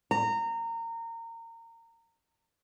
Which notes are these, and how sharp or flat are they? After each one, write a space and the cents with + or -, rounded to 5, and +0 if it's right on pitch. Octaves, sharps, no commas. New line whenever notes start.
A#5 -25